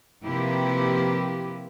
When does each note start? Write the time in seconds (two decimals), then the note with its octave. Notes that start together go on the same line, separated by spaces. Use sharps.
0.24 C3 F3 A#3 E4 G4 B4